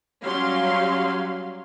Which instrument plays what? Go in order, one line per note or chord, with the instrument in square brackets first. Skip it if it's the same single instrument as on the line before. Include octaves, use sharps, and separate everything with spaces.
[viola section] F#3 G3 C#4 G4 F5 C6